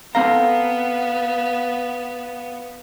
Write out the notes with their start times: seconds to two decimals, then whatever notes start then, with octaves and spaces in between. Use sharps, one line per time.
0.15 B3 C4 A4 F5 A#5